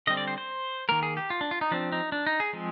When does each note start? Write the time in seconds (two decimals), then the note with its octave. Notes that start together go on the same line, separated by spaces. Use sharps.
0.07 D3 G3 C4 D#5
0.17 D5
0.28 C5
0.38 C5
0.89 D#3 A#3 A#4
1.03 G#4
1.17 G4
1.30 F4
1.41 D4
1.51 F4
1.61 D#4
1.71 F3 C4 D4
1.92 D#4
2.12 D4
2.27 D#4
2.40 G#4
2.53 F3 G#3 C4